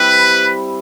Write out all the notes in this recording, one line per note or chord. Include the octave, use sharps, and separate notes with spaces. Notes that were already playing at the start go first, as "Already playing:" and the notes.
Already playing: G3 C4 E4 G4 B4